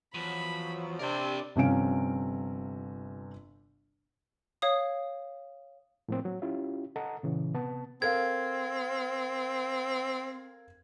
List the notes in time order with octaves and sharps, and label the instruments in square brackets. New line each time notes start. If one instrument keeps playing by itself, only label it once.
[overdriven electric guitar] E2 [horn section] F3 F#3 [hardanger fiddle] B5
[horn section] C3 [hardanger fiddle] D4 [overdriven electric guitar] A#4 C5 [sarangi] D5
[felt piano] G1 C3 F3 C#4 F5 D7
[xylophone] C#5 F5 D#6
[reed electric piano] A2 F3 A#3 C4
F#3
C#4 E4 F4 G4
A4 D#5 F#5 A5 A#5
A#2 C#3 E3
C3 B3 A5
[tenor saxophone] C4 [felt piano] A4 A#4 F5 [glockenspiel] G#6